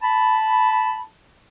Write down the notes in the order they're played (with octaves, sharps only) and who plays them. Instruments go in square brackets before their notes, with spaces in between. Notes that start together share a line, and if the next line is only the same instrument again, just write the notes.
[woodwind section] A5 B5